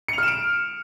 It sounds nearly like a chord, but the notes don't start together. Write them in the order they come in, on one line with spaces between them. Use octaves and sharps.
C#7 F7 F6 E7 D7